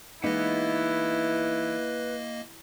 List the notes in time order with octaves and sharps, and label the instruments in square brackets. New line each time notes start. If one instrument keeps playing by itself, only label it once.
[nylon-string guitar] E3 G#3 D#4 [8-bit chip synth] A#3 D#5 [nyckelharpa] E4 [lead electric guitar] B4 F#5